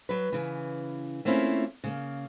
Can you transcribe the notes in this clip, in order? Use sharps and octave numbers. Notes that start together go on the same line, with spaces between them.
F#3 B4
C#3 E3
A3 A#3 C4 C#4 E4 F4
C#3 A#3